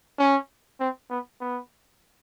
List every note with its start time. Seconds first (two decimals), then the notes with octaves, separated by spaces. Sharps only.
0.18 C#4
0.80 C4
1.10 B3
1.41 B3